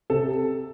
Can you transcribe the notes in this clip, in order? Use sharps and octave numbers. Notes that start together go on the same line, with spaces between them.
C3 A4